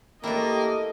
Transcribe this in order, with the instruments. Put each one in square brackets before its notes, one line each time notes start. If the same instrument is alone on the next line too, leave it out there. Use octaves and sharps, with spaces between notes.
[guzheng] A3 E4 [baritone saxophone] A#3 [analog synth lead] G4 [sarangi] D#5